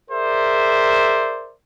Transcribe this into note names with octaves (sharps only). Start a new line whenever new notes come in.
G#4 A#4 C5 D5 E5